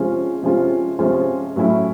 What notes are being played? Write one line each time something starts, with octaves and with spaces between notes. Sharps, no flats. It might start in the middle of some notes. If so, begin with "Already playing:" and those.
Already playing: C3 F3 G#3 C#4 F4
C3 F3 G#3 C#4 F4
C3 F3 G#3 C#4 F4
A2 F#3 A3 C#4 E4